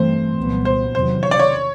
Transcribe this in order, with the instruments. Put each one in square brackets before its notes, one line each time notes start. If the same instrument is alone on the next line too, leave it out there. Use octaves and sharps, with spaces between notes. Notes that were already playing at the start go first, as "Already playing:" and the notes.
Already playing: [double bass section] G2 E3 A3 C4 [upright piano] C5
[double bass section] C2 A#2 F#3 B3
[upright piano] C5
[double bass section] E2 C3 D#3 F#3 [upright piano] C5
[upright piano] C#5
D5
C#5